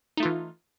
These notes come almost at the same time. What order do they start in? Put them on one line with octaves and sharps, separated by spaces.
D#4 A3 F4 E3